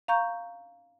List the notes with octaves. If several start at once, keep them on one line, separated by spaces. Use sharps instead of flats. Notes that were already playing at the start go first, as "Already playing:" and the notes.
F5 A#5 C#6 G6